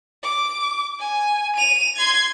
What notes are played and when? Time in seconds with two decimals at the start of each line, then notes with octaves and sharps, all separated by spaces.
0.23 D6
0.99 G#5
1.56 D#7 F7
1.96 C6 G#6